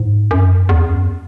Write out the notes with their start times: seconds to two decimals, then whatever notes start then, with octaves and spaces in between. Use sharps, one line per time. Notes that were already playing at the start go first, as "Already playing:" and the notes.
Already playing: G#2
0.31 F#2
0.69 E2
0.88 F#2